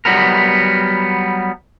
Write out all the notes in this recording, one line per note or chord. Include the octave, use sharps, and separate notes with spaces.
F#3 G3 B3 A#4